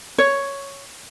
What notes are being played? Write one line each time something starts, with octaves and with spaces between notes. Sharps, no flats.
C#5